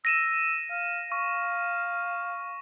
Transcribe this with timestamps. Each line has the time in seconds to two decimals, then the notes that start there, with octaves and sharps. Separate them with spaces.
0.05 E6 A#6 D#7 E7
0.71 F5
1.12 F5 C#6